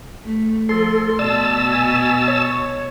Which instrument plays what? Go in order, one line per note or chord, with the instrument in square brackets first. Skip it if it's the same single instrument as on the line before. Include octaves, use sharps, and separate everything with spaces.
[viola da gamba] A3
[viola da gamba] F3 [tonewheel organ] A4 [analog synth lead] C6
[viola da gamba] B2 [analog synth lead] D5 [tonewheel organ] A5 E6
[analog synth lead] G#5
C#5